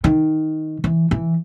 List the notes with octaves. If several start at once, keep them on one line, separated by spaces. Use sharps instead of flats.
D#3
E3
E3